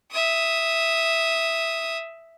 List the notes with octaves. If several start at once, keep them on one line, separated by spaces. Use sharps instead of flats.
E5 D#6